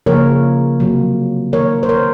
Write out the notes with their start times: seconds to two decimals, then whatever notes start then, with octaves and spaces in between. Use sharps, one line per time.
0.06 C#3 F3 A#3 A#4 C#5
0.80 C3 F#3 A#3
1.53 D#3 A#3 A#4 C#5
1.83 C5
1.89 A#4 C#5